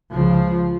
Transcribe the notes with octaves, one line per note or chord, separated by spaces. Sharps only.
C#2 C#3 F3